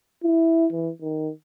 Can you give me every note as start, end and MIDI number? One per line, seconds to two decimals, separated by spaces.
0.24 0.66 64
0.73 0.90 52
1.01 1.30 51